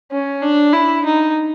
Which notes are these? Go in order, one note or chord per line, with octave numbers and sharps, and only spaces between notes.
C#4
D4
E4
D#4